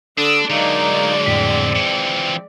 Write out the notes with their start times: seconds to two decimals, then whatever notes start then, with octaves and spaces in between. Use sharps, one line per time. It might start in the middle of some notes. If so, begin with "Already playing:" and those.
0.18 D3 D4 D#6 E6
0.50 D3 F#3 G#3 A#3 D#4 D5
1.26 F2 A2 C4 B6
1.75 E3 F3 C#7